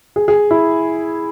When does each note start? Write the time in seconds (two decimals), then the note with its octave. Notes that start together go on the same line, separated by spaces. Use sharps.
0.16 G#4
0.28 G#4
0.51 E4